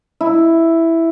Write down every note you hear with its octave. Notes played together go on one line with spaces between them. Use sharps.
E4